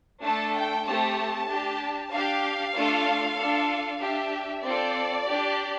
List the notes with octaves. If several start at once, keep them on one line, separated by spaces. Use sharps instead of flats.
A3 D4 A4 A5
G5
A3 C4 G4 A5
D4 G4
D4 G4 F5
A3 D4 F4 A4
D4 F4 A4
D4 G4 E5
C4 F4 A4 D5
D4 G4